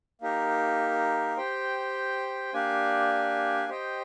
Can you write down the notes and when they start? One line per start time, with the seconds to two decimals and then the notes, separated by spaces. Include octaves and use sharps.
0.21 A#3 D#4 G4 A#4
1.37 G4 C5 G5
2.53 A#3 D4 G4 D5 G#5
3.69 G4 C5 D#5 G5